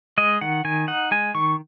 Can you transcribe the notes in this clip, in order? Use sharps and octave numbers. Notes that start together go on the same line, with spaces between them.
G#3 D#5
D#3 F#5
D#3 G#5
D#4 F#5
G#3 G#5
D#3 C#6